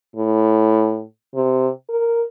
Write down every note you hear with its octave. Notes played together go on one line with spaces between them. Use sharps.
A2
C3
A#4